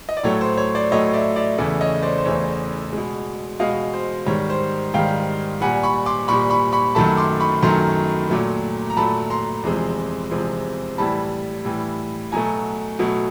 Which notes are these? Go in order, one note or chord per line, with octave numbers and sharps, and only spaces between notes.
D#5
D5
A2 F#3 A3 C#5
C5
C#5
C5 D5
A2 F#3 A3 C#5 D#5
D5 E5
D5 E5
E2 C#3 E3 A3 D5 E5
C#5 D#5
C5 D5
C5
E2 C#3 E3 A3 C#5
B2 G#3
B2 G#3 D#5 F5
C5
G#2 D#3 G3 C#5
C5
G#2 D#3 G3 F5 G5
A#2 G3 F#5 G#5
B5 C#6
C6 D6
A#2 G3 B5 C#6
B5 C#6
B5 C#6
F#2 D#3 F#3 A3 A5 B5
C6 D6
B5 C#6
F#2 D#3 F#3 A3 A#5 C6
A#2 F#3 A3
A#5
A#2 F#3 A3 A5 B5
A#5 C6
E2 C3 F3 G#3
E2 C3 F3 G#3
A2 E3 G3 A5 B5
A2 E3 G3
B2 F#3 A3 G#5 A#5
B2 F#3 A3